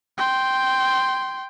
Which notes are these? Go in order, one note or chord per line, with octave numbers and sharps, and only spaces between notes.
G5 C6